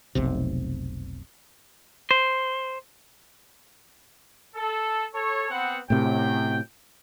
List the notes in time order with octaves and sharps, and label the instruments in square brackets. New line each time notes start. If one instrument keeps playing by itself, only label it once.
[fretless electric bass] F1 B1 C3
[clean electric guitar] C5
[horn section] A4
A4 C#5
B3 C4 F#5
[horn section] F#2 G5 [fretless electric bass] A2 C3